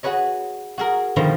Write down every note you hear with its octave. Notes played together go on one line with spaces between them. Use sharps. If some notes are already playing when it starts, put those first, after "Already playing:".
F#4 G#4 B4 C#5 D#5
F#4 G#4 A#4
B2 D3 D#3 F3 G3